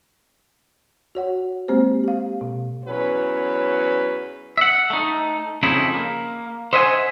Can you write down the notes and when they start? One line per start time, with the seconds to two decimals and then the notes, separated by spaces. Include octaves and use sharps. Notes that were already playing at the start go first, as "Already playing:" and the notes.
1.15 F#4 C#5 F#5
1.68 G#3 A#3 C4 G4 C5
2.04 G4 F5
2.41 B2
2.85 E2 F#3 C#4 B4
4.57 E5 F#5
4.90 A3 D#4
5.63 F2 C#3 F3 D#4 E4
5.94 A#3
6.73 C5 D#5 E5 F#5 G#5